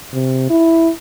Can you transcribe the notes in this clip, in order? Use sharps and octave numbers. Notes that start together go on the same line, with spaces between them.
C3
E4